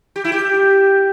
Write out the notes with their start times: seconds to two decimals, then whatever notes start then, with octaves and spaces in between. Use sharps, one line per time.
0.16 G4
0.24 E4
0.32 G4